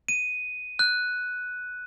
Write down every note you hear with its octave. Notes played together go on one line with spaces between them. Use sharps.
D#7
F#6